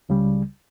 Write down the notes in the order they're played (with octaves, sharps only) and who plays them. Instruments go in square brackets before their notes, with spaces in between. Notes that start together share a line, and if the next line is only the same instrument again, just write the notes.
[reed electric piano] C#2 C#3 G3